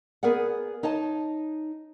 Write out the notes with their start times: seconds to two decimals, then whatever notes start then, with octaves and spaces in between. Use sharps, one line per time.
0.23 B3 G#4 A#4 D5 F#5
0.83 D#4 C#5 D#5 A5